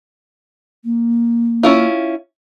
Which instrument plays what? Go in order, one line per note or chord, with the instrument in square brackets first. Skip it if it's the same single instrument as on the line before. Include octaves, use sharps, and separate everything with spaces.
[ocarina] A#3
[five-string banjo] C#4 E4 F4